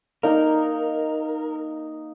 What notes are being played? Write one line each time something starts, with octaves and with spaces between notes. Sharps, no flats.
A#3 D#4 A#4